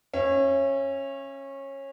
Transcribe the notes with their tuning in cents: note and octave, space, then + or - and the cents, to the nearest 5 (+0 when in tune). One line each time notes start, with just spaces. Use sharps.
C#4 -20 E5 +30